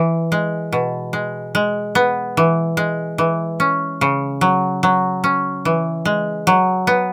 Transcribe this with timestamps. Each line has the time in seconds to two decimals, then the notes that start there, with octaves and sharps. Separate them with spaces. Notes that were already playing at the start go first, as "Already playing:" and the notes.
Already playing: E3
0.32 G#3
0.73 B2
1.13 G#3
1.55 G#3
1.95 B3
2.37 E3
2.77 G#3
3.18 E3
3.60 C#4
4.01 C#3
4.41 F#3
4.83 F#3
5.24 C#4
5.65 E3
6.05 G#3
6.47 F#3
6.87 B3